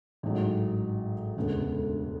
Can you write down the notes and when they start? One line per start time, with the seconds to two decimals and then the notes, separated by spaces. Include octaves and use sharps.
0.23 A1 G#2 F#3
1.37 E1 D2 C#3 G#3 B3